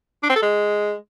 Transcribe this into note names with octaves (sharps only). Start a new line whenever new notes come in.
D4
C4
A4
G#3